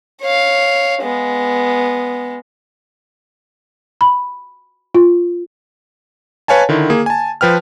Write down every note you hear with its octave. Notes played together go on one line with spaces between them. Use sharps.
C#5 F5
G#3 B3
B5
F4
B4 C#5 F5 G#5 A5
D3 D#3 E4
A#3 G#4
G#5 A5
F3 B4 G5 F6